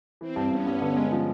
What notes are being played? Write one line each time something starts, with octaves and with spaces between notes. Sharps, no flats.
E3 C4
G2
G2 B3 C#4
G2
D3
G#3
F3